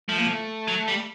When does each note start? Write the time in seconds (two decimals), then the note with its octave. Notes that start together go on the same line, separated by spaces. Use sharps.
0.09 F3 A3
0.18 A#3
0.27 A3
0.68 F#3
0.88 G3